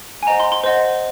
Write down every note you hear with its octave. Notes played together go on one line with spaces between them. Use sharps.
G#5
C5 D#5 F#5 A#5
C6
C6
C5 D#5 F#5